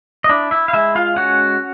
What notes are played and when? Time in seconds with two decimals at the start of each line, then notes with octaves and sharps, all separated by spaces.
0.24 D#5
0.29 D4 E4 D5
0.51 E4 E5
0.68 F5
0.73 G#3 E4 E5
0.95 F4 F5
1.16 C#4 F#4 F#5